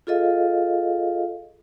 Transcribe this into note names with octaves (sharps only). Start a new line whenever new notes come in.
F4 G#4 A4 D#5 F5